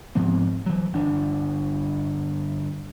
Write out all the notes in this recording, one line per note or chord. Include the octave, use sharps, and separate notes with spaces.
G#2 F3 B3 C4
E3 F#3
G1 D4